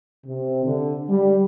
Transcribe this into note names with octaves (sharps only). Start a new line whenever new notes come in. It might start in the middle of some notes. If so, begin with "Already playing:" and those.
C3
D3
G3